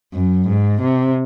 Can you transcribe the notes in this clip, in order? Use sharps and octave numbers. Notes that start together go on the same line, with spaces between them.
F#2
G#2
C3